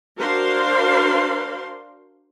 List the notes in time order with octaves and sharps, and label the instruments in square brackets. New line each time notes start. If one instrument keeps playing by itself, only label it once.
[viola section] D4 F#4 A#4 C5 F5 C6